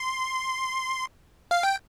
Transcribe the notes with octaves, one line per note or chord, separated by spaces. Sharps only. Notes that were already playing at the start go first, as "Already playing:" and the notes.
Already playing: C6
F5
G5